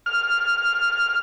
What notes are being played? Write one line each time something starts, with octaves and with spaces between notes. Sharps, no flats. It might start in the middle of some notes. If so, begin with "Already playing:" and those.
F6